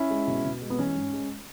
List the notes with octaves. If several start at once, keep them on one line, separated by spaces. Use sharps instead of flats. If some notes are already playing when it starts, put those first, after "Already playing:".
Already playing: C#4 E4
G#3
B2
B2
G#3
B3
E3 C#4
G#2
G#3